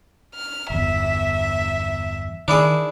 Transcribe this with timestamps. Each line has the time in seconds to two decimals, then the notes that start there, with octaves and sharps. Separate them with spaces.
0.35 F6
0.70 G1 E2 E5
2.48 D#3 D4 E4 G#4